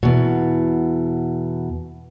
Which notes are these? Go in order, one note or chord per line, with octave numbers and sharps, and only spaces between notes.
E2 B2